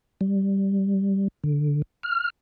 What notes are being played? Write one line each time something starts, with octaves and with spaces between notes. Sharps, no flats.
G3
D3
F6